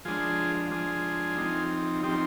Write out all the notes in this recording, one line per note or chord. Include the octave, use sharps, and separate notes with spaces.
F3 G#3 D4 F4 G#4
F3 G#3 D4 F4 G#4
F3 C4 D#4
F3 C4 D#4 G4